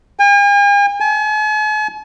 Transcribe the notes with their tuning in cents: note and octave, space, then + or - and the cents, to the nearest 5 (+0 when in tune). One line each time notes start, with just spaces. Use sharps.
G#5 -45
G#5 +45